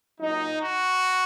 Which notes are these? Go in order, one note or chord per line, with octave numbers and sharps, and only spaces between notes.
A#2 F#3 D#4
F#4